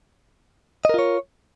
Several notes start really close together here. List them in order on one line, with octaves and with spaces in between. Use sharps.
D#5 A#4 F4 C#5